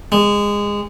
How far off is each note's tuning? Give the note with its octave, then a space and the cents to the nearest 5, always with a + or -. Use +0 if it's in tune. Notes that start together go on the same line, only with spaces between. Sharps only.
G#3 -20